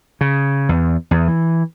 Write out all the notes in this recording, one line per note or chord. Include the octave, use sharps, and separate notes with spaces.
C#3
E2
E2
E3